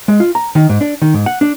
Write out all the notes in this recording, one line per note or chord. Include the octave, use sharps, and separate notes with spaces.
G#3
F4
A#5
D#3
G#2
D4
D#3
G#2
F#5
D4